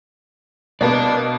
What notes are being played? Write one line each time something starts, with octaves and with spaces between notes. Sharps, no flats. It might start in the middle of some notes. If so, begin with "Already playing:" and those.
B2 A#3 B3 D5 A5